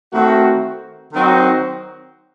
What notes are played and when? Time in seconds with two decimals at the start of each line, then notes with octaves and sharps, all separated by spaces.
0.13 D#3 A3 C4 F#4
1.13 D#3 F#3 C4 D#4 F#4